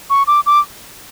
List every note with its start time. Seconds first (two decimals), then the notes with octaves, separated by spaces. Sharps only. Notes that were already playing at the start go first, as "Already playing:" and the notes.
0.10 C#6
0.27 D6
0.46 D6